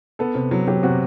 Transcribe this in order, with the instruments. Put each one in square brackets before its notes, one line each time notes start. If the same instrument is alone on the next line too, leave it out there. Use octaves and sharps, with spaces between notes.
[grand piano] B3 A4
C3
F#3
F#3 G4
C3 F#4